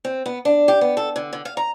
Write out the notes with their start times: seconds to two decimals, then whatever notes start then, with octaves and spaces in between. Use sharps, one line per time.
0.05 C4
0.26 B3
0.45 D4
0.68 G4
0.81 B3
0.97 A4
1.16 D3
1.33 D3
1.45 F5
1.57 A#5